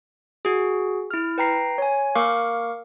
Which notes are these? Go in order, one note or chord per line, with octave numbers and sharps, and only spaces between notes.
F#4 G#4
E4 F6
B4 G5 A#5 C7
C#5 G#5
A#3 A#4 F5 C#6 D6